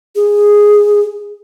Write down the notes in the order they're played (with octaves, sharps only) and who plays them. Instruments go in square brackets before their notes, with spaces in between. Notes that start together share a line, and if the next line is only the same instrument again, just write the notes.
[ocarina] G#4